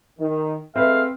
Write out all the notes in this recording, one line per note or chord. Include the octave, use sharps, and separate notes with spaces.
D#3
G#3 A3 C4 B4 E5 F5